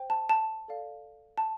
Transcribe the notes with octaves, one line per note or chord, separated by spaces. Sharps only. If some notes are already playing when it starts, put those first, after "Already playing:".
Already playing: C5 G5
A5
A5
A4 D5 F5
A5